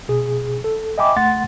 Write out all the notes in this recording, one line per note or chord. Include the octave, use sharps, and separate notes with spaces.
B2 G#4
A4
D#5 E5 G5 G#5 B5 D6
C#2 A3 F#5 C6 A6